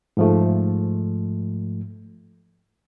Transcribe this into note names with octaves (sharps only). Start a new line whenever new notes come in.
G#2 F3 A3